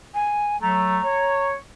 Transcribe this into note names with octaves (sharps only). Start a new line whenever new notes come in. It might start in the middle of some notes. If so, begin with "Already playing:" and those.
G#5
F#3 A3 A#5
C#5